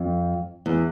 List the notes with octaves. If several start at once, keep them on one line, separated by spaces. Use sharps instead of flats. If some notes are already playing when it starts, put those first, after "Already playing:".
Already playing: F2
E2